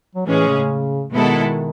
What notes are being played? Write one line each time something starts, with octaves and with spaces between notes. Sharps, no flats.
F#3
A2 E3 G#3 C#4 G#4 C#5
C#3
B2 D#3 G#3 B3 E4 A4